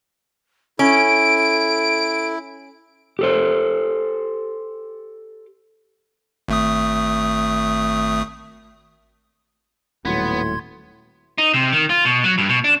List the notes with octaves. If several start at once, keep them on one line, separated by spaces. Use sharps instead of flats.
C#4 E4 A4 D7
G4 A4 C5
G#1 A3 D#6
D#1 A2 F#3 B3 C6 G#6
D#4
C3
D#3
F4
B2
F#3
G2
B2
D4